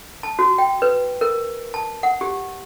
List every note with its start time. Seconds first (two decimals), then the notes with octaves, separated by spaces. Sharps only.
0.23 A5
0.39 F#4
0.58 G5
0.82 B4
1.21 A#4
1.74 A5
2.03 F#5
2.21 G4